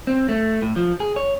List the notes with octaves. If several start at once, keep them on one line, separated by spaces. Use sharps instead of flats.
C4
A3
A2
F3
G#4
C#5